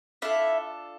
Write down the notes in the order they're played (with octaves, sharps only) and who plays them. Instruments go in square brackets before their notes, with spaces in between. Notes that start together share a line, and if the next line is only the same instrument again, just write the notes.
[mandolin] D4 E4 F4 A4 E5